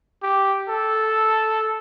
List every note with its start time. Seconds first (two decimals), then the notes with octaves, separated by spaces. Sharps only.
0.23 G4
0.69 A4